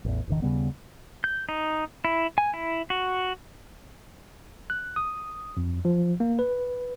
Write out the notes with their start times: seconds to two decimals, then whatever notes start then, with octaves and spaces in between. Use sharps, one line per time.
0.05 A1 E2
0.28 E1 A1 D3 D#3
0.42 D#2 C#3 G3 B3
1.24 G6
1.49 D#4
2.05 E4
2.38 G#5
2.54 E4
2.90 F#4
4.70 F#6
4.96 D#6
5.57 F2
5.85 F3
6.20 A#3
6.39 B4